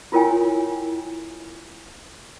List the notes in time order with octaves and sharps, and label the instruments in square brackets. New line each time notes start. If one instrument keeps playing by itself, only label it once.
[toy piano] E4 F4 A#4 C#5 G5 G#5